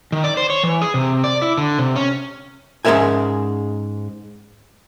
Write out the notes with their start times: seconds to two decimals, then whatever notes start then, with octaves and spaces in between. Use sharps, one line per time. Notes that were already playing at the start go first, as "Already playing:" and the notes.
0.12 D#3
0.24 D5
0.37 C5
0.50 C#5
0.63 E3
0.82 G#4
0.94 C3
1.24 D5
1.42 E4
1.58 D3
1.79 C3
1.96 C#4
2.85 G#2 G#3 C#4 A#4 E5 G#5